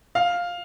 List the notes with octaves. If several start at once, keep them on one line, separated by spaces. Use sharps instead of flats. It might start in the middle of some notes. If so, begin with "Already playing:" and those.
F5